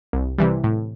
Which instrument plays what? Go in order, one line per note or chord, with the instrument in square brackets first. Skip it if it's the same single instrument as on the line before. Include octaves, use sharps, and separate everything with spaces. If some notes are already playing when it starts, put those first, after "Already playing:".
[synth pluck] C2
C3 E3 G3
A2